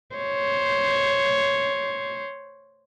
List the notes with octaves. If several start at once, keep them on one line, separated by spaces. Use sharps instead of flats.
C5 C#5